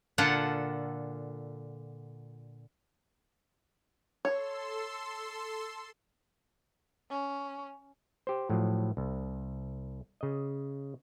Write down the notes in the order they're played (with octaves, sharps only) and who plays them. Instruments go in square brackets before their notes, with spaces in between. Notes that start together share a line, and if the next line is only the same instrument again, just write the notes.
[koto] A#2 D3 F4 A4 F#5
[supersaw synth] A4 C6 E6 [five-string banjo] C#5
[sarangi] C#4
[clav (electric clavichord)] G4 C5
A2 F3 F#3
C2
C#3 D#5